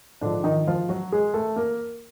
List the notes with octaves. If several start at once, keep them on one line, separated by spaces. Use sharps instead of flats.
G#2 D3 F3 D4
D#3 D#4
F3 F4
F#3 F#4
G#3 G#4
A3 A4
A#3 A#4